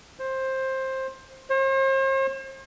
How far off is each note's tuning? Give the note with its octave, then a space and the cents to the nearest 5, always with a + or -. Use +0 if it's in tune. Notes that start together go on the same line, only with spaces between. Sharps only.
C5 +15
C5 +45